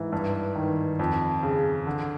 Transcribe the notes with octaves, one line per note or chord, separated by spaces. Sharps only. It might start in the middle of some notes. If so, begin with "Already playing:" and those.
Already playing: G#2 E3
G2
D#3
F2
C#3
D3